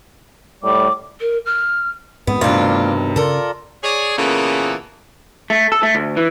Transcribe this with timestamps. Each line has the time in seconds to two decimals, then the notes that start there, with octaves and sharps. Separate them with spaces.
0.63 A2 G3 D6
1.21 A#4
1.46 F6
2.27 E2 G#2 B2 D#3 G#3 B3 C4
2.41 G2 C3 A3 D4 F4
3.16 C#3 F4 A4 A#4 D5
3.84 G#4 C#5 D5
4.18 A#2 C#3 E3 A#3 B3 A4
5.50 A3
5.72 A4
5.83 A3
5.95 D2
6.16 E3